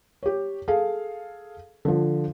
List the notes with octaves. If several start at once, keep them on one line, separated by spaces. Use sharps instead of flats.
G4 C#5
G#4 A4 F5
D3 F3